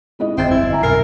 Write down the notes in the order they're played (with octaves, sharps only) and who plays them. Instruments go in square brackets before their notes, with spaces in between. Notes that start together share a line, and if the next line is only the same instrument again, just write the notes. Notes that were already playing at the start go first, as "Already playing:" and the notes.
[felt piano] G#3 E4 D#5
[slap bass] G1 F2 [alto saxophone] C4 [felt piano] E5 A6
[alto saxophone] E4
[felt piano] E5 G#5 A#5
[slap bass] B1 F2 A#2 [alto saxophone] A#4 [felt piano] C7